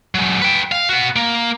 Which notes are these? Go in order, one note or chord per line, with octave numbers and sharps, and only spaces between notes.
F#3 G#3
B4 G5
F5
B3 F#4
A#3